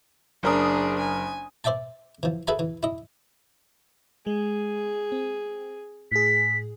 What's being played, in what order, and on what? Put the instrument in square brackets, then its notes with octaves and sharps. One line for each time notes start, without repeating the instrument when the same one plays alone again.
[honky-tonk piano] F#1 A#4 D#6 [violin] D4 G#4
[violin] G#5
[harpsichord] C5 D5 E5 G5 A5
E3 F3
G#4 A4 B4 E5 G#5 A#5
E3
E4 D#5
[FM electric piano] G#3 [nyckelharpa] G#4
[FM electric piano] C4
[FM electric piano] A2 G#4 [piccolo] B6